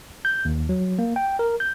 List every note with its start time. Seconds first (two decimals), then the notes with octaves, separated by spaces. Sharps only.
0.25 G6
0.45 D#2
0.69 F#3
0.99 A#3
1.16 G5
1.39 A#4
1.60 G6